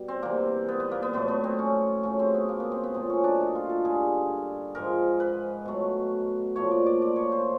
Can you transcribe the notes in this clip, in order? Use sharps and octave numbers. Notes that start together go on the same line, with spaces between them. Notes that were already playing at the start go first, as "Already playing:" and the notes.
Already playing: B2 G3
C4
C3 E3 G3 A#3
B3
B3
A#3
B3
A2 F#3 A3 B3
B3
C4
C#4
C#3 F#3 A3 C#4
C4
B3
A#3
B3
C4
B3
A#2 F#3 A3 C4
C#4
D4
D#4
F4
A4
G2 D3 G3 G#4
G#2 F3 G#3 A#4
B4
B2 F#3 A3
A#2 F3 A3 C#5
D5
D5
D5
C#5
C5